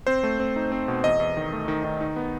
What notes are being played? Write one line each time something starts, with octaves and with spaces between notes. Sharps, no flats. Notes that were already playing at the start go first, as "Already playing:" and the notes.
C4 C5
A3
C4
D#4
C4
B2
E2 D#5
E2
D#3
A3
D#3
D#3
D#4
B3